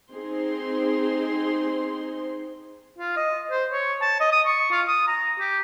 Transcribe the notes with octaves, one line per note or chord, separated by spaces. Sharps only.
C4 D#4 G#4 C5 C6
F4
D#5
C5
C#5
A5
D#5
D#6
C#6
F4
D#6
A#5
G4